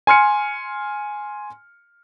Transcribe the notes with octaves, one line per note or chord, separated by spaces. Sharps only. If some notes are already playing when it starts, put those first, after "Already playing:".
G#5 C6 F6 C#7